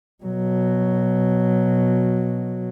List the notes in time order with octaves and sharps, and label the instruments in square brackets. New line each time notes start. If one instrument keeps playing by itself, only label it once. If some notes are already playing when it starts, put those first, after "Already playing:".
[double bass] B2 F#3